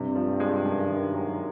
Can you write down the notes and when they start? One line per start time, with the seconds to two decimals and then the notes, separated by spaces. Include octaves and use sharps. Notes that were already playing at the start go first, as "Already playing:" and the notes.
Already playing: G2 C3
0.16 F3
0.40 G#3
0.65 F#2
0.89 D#3
1.14 F#3